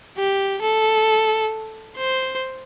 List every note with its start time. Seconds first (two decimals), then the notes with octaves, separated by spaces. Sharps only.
0.17 G4
0.62 A4
1.97 C5